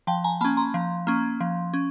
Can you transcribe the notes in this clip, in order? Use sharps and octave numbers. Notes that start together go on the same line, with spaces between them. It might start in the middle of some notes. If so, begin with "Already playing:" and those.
F3 G5 A5
G#5 A#5
A#3 C#4 A5 B5
A#5 C6
F3
A#3 C#4
F3
C#4